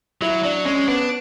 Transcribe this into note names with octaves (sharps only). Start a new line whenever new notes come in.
F#3 E4
F#3 D4
G#3 C#4
B3 D4